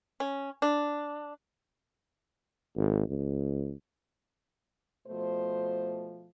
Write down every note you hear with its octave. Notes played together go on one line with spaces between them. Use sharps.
C#4
D4
G#1
C#2
B2 F3 A3 C5